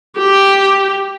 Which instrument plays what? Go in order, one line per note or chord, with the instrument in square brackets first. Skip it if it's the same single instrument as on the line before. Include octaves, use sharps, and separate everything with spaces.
[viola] G4